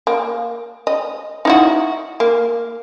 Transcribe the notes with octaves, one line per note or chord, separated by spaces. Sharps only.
A#3
D#5
D#4 E4 F#4
A#3